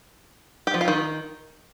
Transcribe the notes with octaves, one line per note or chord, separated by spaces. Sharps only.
G4
F3
F4
D#3